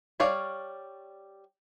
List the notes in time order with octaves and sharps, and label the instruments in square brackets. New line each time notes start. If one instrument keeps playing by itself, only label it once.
[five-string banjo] G3 C#5 D5 F5